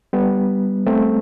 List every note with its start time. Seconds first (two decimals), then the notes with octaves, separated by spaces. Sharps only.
0.13 G3 B3
0.87 A3 C4